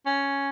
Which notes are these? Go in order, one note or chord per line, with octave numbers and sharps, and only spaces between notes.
C#4